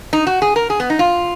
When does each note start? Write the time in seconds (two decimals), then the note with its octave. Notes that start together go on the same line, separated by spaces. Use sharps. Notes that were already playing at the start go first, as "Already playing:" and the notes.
0.13 D#4
0.27 F#4
0.42 G#4
0.56 A#4
0.70 G#4
0.80 B3
0.90 D#4
0.99 F4